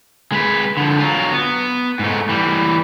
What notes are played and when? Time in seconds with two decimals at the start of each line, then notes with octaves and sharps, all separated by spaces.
0.32 G#3 B4
0.77 D3 F3
1.00 F#3 F4
1.32 B3
1.99 G#2 A3
2.29 E3 G3